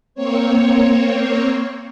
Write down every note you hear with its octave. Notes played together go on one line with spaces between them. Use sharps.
A#3 C4 C#5